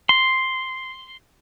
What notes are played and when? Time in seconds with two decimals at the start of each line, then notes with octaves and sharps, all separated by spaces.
0.09 C6